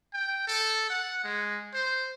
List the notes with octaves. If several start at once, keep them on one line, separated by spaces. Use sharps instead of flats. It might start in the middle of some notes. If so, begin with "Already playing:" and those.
G5
A4
F#5
G#3
C5